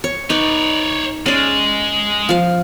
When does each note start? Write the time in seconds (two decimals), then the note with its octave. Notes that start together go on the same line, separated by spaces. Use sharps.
0.04 C#5
0.30 D#4 B4 C#5 D5
1.26 G#3 C#4 D5
2.29 F3 F5